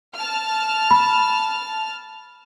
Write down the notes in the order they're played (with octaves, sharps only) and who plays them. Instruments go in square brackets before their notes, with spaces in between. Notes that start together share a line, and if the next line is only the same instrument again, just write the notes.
[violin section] A5 F6
[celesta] B5